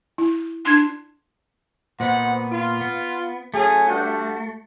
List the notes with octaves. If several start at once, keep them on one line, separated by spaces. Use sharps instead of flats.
E4
D4 C6 G#6
A#2 B3 C5 D#5 F#5
F4
B3
F#3 A3 C#4 G#4
G2 F#4